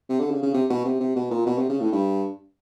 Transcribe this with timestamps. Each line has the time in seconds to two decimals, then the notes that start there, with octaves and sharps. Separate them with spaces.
0.09 C3
0.20 D3
0.31 C#3
0.43 C#3
0.54 C3
0.70 B2
0.85 C3
1.00 C3
1.16 B2
1.31 A#2
1.46 B2
1.58 C3
1.69 C#3
1.80 A2
1.92 G2